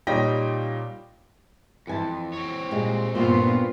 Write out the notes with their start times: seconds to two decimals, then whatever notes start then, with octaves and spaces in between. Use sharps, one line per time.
0.07 A#2 G3 D#4 C#5 G5 A#6
1.87 F2 E3 G#5 A5
2.33 C4 C#5
2.71 A#2 G3 G#3
3.15 G2 A#2 D3 B3 F4 C5